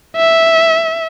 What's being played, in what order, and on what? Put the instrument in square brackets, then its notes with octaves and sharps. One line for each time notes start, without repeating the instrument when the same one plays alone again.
[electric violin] E5